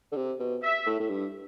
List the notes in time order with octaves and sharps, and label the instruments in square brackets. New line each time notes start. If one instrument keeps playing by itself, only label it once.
[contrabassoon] D3
C3
B2
[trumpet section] E5
[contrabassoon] A2
A2
G2